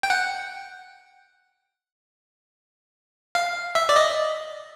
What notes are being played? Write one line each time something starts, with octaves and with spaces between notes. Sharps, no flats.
G5
F#5
F5
E5
D5
D#5